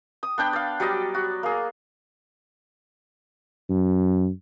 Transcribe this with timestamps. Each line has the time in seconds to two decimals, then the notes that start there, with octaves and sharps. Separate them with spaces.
0.23 D#6
0.38 B3 D4 G5 B5
0.53 D5 F5
0.80 F#3 G3 D5 D#5
1.14 F#4
1.43 A#3 G#4
3.70 F#2